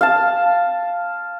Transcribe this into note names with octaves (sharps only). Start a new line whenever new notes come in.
F5 A5